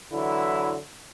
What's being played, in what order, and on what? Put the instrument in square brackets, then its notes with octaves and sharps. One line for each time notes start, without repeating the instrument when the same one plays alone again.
[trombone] D3 [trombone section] E3 F#3 E4